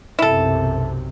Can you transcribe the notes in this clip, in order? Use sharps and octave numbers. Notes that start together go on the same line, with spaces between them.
B1 F#2 C3 E4 A4